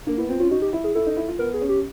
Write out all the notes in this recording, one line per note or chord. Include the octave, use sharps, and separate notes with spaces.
A#3 D4
B3 E4
C4 F4
C#4 F4
D#4 F#4
G4
E4
G#4
E4 A4
D#4
E4
F4
B3 A#4
G#4
C#4
G4